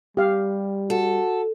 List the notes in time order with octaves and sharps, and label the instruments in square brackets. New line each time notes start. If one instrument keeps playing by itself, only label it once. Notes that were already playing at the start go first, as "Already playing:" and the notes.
[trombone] G3 [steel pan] G4 F5
[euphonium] F#4 [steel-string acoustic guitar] A4